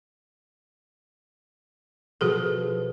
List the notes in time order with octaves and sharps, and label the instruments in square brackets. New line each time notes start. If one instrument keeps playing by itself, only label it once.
[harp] B2 F3 [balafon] F#4 G#4 A4